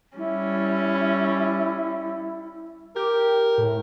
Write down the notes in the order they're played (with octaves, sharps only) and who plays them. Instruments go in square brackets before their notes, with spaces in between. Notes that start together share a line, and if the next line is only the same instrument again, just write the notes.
[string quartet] G3 C#4 [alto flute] E4
[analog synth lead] G4 [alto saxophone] A#4
[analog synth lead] A2